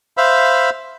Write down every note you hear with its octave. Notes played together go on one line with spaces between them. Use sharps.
C5 E5 F5 B5